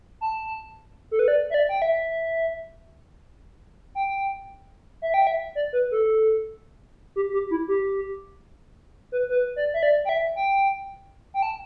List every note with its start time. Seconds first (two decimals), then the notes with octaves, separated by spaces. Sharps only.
0.21 A5
1.11 A4
1.19 B4
1.28 D5
1.50 E5
1.54 D5
1.69 G5
1.82 E5
3.95 G5
5.02 E5
5.14 G5
5.27 E5
5.55 D5
5.73 B4
5.91 A4
7.16 G4
7.33 G4
7.51 E4
7.68 G4
9.12 B4
9.29 B4
9.56 D5
9.74 E5
9.83 D5
10.05 G5
10.09 E5
10.36 G5
11.34 G5
11.43 A5